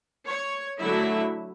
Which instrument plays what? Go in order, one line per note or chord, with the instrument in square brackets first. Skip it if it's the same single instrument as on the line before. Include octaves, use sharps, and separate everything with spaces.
[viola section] C#5
D3 F#3 A3 E4 E5